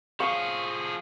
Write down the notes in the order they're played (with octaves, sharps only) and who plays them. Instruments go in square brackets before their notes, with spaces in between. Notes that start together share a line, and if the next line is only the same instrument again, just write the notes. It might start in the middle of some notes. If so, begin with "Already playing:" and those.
[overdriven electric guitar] F3 G#4 [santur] F5 C#6